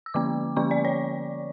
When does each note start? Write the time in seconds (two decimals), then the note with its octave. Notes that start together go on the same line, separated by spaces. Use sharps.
0.06 E6
0.14 D3 F3 A#3 C#4 D6
0.56 D3 F3 A#3 C#4 C#6
0.71 D5
0.85 C#5